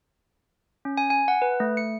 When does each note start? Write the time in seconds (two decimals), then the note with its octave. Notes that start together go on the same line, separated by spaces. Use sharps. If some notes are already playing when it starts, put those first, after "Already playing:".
0.85 C#4
0.98 G#5
1.10 G#5
1.28 F#5
1.42 B4
1.60 A3
1.77 C#7